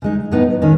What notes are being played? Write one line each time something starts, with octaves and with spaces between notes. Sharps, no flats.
C#3 G#3 D#4
A2 F#3 B3 D#4
D#3 G#3 C#4